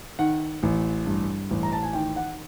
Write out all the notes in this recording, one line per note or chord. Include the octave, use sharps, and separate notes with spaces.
D#3 F#5
A1
G2
A1
A#5
A5
G#5
D#3 G5
F#5